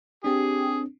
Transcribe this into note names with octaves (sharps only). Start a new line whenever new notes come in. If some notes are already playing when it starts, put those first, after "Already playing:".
C4 D4 G4 G#4